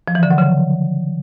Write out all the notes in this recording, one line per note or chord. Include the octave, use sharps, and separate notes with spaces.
F3
E3
D3
F#3
C#3